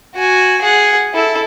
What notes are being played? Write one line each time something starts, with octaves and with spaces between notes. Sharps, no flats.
F#4 G#5
G#4 F#5
E4 A4